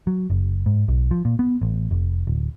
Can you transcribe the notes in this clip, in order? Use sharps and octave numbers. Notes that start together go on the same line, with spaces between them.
F#3
F#1
G#2
B1
F3
A#2
B3
A1
F1
D1